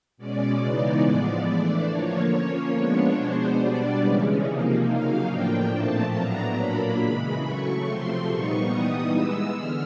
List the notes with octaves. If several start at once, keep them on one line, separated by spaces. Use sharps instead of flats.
B2 G#3 C#4 D5
C#3 E3 G#3 B3 D#4
A2 F3 G#3 B3
E3 A3 D4 D5
D3 F3 A#3 C#5
F3 A#3 C#4
F3 G#3 B3 D4
B2 G#3 B3 D4 C5
B2 G3 B3 D4 D5
C#3 E3 G#3 C#4
C3 F3 A#3 D#4
C#3 F#3 A#3 D#4 F5
A2 F3 A#3 D4 G5
A#2 F3 A3 C4 A5
A2 F#3 B3 D4 A#5
A#2 F#3 A#3 D4 B5
C#3 E3 G#3
C#3 F#3 A3 C#6
C3 F3 A3 C4 C6
A#2 G3 B3 D#4 C#6
E3 G3 B3 D#4 D#6
E3 G#3 B3 E6
D3 F6